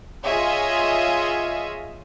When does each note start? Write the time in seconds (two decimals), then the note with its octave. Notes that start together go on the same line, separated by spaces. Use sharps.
0.24 F4 G#4 C#5 D#5 E5